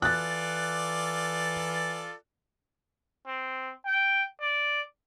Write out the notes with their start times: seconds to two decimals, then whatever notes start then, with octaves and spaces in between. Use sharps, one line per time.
0.02 E3 F4 A4 D5 F#6 A6
3.27 C4
3.86 G5
4.41 D5